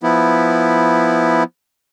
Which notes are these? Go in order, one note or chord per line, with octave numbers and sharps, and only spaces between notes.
F3 B3 E4